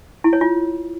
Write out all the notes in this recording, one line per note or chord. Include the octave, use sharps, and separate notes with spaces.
E4
C#5
F4